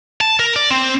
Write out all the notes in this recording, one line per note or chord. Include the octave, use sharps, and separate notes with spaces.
A5
A#4
D5
C4